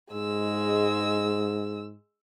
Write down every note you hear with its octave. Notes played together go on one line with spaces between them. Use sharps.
G#2 G#3 E6